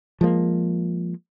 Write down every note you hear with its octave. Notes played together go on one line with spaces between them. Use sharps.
F3 G#3 A#3